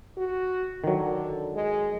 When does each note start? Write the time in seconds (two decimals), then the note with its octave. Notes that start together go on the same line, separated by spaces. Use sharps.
0.17 F#4
0.84 D3 D#3 F#3
1.54 G#3